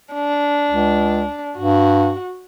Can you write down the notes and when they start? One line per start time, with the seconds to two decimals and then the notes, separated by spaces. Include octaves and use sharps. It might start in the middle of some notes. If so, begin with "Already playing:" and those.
0.14 D4
0.71 C#2
1.58 G2 F#4